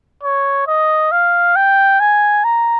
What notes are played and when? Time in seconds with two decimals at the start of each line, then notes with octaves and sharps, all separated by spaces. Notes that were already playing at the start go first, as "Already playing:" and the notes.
0.23 C#5
0.67 D#5
1.12 F5
1.56 G5
2.00 G#5
2.44 A#5